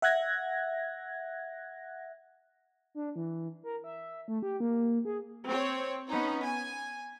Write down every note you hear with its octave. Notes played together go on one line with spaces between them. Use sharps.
E5 F#5 F#6 G#6 A#6
D4
E3
A#4
E5
A3
G4
A#3
G#4
C4 C#5
B3 C#4 D#4
G#5